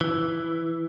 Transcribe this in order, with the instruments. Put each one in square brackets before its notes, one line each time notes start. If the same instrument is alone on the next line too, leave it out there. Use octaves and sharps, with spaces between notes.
[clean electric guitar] E3